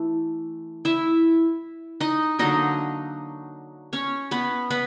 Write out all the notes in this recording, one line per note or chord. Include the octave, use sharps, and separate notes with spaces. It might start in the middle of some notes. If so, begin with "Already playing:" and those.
Already playing: E3 A3
E4 E5
D#4 D#5
D3 F#3 A#3 D#4 D#5
C#4 C#5
B3 B4
B3 B4